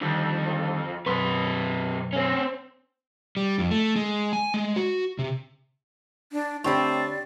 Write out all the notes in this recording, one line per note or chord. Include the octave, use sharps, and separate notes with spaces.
F2 D3 D#3 G3
B1 F#2 C3 B4 C6
C4 C#4
G3
F2
A3
G#3
G#5
G#3
F#4
C3
D4
D3 A3 C4 G4 C#5 D5 B5